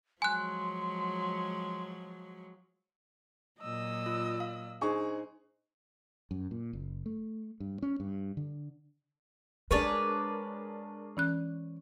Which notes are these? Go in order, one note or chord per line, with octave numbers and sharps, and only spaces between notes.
F3 F#3 G#3 G#5 C6 F#6
A#2 F#3 D#5 E6
F4
F5
D4 D#4 G#4 C5 C#6
F#2
A#2
F#1
A3
G2
C#4
G2
D3
G#3 D4 G#4 A#4 B4 C#5 D5
E3 C#4 F#6